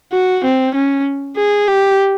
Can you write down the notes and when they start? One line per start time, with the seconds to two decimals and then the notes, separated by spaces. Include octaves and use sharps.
0.13 F#4
0.45 C4
0.75 C#4
1.37 G#4
1.68 G4